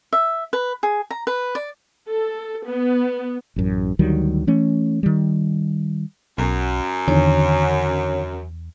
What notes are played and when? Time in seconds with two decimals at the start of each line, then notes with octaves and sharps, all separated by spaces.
0.13 E5
0.53 B4
0.83 G#4
1.11 A#5
1.27 B4
1.55 D5
2.06 A4
2.66 B3
3.56 A1 F#2
3.99 D2 D#3 F#3 G3
4.47 E3 A3 C#4
5.03 D#3 G3
6.38 B1 F#2
7.08 E2 D3 D#3 C#5